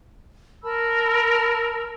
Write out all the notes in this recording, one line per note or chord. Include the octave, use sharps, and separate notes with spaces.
A#4 A5 B5 E6